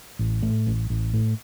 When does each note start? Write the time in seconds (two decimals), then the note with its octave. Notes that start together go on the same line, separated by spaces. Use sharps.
0.19 A1
0.42 A2
0.67 A1
0.90 A1
1.14 A2